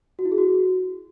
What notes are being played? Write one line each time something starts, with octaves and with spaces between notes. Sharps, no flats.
F#4
E4
G#4
F#4